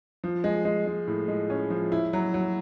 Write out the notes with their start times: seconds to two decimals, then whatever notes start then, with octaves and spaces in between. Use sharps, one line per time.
0.24 F3
0.44 G#3
0.65 G#3
0.87 G#3
1.07 A2
1.28 G#3
1.50 C#4
1.70 F3
1.92 E4
2.13 F#3
2.34 F#3